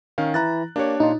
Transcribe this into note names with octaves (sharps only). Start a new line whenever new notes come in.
D#3 C#4 F5
E3 E4 A#5 F#6 A6
A#3 D4 G4 C#5
A#2 D#4 F4